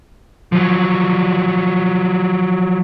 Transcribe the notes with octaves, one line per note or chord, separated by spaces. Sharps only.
F3 F#3